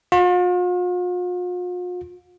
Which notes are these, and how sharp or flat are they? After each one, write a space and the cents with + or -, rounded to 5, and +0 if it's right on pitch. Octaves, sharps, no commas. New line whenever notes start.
F4 +45